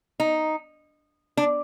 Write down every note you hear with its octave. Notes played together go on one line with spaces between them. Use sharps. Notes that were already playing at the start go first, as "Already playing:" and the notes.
D#4
D4